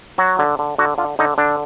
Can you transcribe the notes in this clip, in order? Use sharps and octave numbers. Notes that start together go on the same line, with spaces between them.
F#3 F#4
D3
D3
D3 F#4
D3 F4
D3 D#4
D3 D4